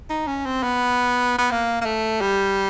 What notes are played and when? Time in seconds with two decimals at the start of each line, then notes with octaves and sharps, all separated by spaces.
0.10 D#4
0.27 C#4
0.46 C4
0.63 B3
1.39 B3
1.51 A#3
1.82 A#3
1.86 A3
2.21 G3